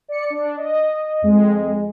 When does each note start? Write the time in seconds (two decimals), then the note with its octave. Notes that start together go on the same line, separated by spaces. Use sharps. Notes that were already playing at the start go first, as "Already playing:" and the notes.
0.08 D5 C#7
0.30 D4
0.57 D#5
1.22 F2 G#3